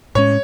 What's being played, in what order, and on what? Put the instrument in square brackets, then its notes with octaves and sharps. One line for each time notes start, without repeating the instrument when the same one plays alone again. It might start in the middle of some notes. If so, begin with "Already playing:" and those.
[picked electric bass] A2 G#3 C#4 [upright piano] C#5